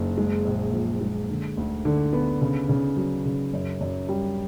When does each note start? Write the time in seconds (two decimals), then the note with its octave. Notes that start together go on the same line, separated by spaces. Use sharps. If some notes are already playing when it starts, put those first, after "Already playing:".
Already playing: F#1
0.17 G#3
0.45 A#1
0.73 F3
1.01 G#3
1.29 D3
1.57 D2
1.85 D3
2.13 B3
2.41 C#3
2.69 C#3
2.97 F#3
3.25 C#3
3.53 F#2
3.81 F#2
4.09 G3